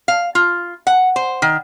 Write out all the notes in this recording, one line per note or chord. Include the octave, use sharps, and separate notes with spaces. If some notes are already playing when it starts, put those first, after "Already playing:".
F5
F4
F#5
C5
D#3